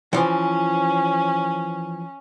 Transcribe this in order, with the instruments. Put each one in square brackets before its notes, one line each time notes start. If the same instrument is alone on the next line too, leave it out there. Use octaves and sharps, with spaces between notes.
[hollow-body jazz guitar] E3 F3 [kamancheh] C#4